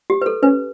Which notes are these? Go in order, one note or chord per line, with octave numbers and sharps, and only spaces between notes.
G4
B4
A4
C#4 B4